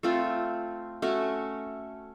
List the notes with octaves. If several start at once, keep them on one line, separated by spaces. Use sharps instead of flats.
A3 C4 F4 A4
A3 C#4 F#4